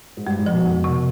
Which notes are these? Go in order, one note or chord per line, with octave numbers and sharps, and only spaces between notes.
G#2
G2 G#3
G#2
F3
B2
F2
C3